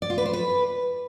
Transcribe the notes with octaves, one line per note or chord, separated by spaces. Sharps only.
D5
F4
B4
C5
B4